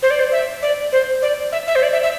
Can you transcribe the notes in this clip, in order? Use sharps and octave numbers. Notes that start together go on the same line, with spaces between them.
C5
D5
C5
E5
D5
C5
D5
E5
E5
C5
D5
E5
E5